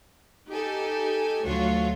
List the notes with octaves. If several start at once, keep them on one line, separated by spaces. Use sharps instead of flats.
D#4 G4 A4 G#5
D2 F#3 A3 F4 F#4 C#5